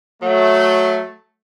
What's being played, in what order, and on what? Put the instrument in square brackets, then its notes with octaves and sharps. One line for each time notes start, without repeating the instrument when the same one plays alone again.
[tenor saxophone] F#3 [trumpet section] A3